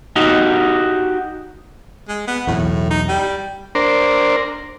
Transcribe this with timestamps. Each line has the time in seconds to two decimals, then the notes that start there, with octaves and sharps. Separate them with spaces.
0.16 D#4 F#4 G4
2.08 G#3
2.27 B3
2.47 E1 B1 E2 A2
2.90 D#4
3.08 G3
3.75 D4 A#4 C5